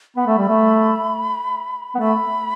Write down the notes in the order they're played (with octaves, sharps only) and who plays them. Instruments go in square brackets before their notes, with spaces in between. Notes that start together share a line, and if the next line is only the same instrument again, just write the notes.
[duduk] B3 [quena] B5
[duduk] A3
G3
A3
B3
[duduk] A3 [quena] B5